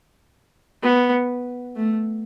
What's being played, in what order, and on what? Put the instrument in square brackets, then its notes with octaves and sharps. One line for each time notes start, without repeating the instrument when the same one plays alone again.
[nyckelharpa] B3
A3